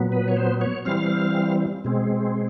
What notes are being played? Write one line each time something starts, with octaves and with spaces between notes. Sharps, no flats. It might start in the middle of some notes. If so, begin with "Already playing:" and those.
Already playing: A#2 F#3 B3
B4
C#5
C5
C#5
E3 G3 C4 F5
B2 G#3 C4